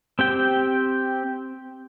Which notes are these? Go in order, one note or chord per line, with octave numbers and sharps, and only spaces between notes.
C4 G4 G5